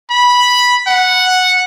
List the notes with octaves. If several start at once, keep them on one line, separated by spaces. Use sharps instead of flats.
B5
F#5